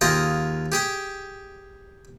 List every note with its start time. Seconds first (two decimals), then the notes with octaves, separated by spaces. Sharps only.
0.01 D#2 F4 G#4 D#5 G5
0.72 G4 G#4 G5